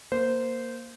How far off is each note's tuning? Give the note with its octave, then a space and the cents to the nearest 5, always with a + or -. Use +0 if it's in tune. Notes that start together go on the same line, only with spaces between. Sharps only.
A#3 +0 C5 -15